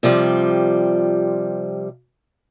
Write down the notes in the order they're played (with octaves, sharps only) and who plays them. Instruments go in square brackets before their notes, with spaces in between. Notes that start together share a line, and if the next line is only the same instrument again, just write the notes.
[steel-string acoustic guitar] C3 F3 G3 F4